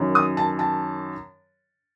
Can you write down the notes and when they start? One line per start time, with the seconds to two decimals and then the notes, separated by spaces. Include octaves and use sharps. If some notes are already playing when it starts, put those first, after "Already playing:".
Already playing: F#2 D#3 F#3
0.15 D#6
0.37 A5
0.59 A5